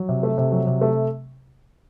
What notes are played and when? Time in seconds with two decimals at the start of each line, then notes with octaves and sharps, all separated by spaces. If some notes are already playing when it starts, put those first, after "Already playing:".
Already playing: F#3
0.09 C3
0.23 A3
0.38 C3
0.51 F#3
0.67 C3
0.81 A3